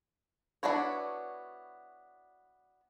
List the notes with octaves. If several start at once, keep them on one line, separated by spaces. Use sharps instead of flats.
B3 D4 E4 F#4 C#5